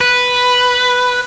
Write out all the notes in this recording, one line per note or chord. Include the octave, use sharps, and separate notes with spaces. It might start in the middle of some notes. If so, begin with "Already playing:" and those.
B4